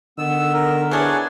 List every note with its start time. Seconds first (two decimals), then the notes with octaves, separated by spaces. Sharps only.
0.18 D3 D#3 B3 E6
0.53 A#4
0.91 E3 D4 G#4 C#5 F#5